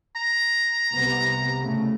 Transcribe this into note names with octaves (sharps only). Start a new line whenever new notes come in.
A#5
C2 C3 B3
A2 C#3 A3